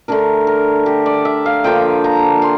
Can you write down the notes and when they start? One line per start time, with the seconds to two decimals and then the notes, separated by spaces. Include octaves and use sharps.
0.08 D3 A3 D4 A#4
0.47 A#4
0.86 G4
1.06 D5
1.25 E5
1.46 F5
1.64 D3 F3 A#3 G5
2.04 A#5
2.42 C6